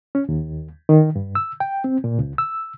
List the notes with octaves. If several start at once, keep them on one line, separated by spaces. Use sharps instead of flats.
C#4
D#2
D#3
G2
E6
G5
C4
A#2
C#2
E6